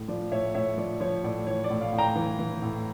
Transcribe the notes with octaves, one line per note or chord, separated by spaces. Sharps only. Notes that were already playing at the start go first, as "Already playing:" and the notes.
Already playing: A2
F3 D5
A2 C#5 E5
A2 C#5 E5
F3 D5
F3 C#5
A2 D5
E3 C#5
D5
A2
D5 F5
A2
G5 A#5
E3
E3
A2